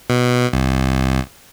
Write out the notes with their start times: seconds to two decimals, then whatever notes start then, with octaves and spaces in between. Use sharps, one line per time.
0.10 B2
0.53 C2